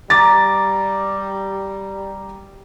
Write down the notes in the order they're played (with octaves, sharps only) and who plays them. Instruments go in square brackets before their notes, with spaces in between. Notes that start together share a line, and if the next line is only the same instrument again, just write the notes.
[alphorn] G3 [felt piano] A#5 D6 A6